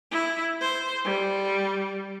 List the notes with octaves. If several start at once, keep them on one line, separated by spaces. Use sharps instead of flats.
E4
C5
G3